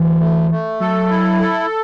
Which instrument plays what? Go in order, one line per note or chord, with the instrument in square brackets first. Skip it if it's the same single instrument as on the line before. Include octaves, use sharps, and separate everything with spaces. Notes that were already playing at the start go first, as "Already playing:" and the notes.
Already playing: [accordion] D2 [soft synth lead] E3
[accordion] A3
A3
[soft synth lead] F#3 [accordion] A4
[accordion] E4
A4